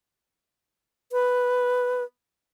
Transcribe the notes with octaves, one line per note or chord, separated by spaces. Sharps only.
B4